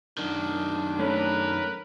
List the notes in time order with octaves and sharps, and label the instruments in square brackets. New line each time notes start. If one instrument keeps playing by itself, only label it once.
[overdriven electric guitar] F#2 D#3 [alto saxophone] D4
[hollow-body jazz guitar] A3 C#4 [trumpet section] A#4 B4